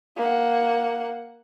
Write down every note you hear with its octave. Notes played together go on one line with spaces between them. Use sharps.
A#3 F#5